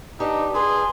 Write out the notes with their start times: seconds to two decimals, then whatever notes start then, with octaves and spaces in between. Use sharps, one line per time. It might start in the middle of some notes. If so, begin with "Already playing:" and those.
0.20 D4 D#4 G4 B4
0.55 F4 G#4 B4 C6